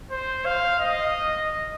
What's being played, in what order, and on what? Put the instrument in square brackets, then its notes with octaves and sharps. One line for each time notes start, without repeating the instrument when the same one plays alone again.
[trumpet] C5
F5
D#5